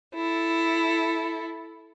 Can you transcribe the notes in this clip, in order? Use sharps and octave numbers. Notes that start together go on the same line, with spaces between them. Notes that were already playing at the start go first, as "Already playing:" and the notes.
E4 A4